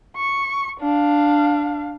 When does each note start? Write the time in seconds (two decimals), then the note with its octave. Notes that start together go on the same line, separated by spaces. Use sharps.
0.17 C#6
0.81 D4 F5